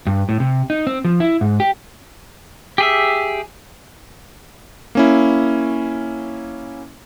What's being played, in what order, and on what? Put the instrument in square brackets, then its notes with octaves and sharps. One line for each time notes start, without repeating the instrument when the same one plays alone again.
[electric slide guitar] G2
A2
C3
D#4
C4
F3
E4
G#2
G4
[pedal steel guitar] G4 G#4 E5
[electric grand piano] A#3 C#4 E4